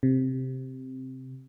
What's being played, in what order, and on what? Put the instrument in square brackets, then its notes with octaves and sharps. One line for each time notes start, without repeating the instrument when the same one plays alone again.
[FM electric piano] C3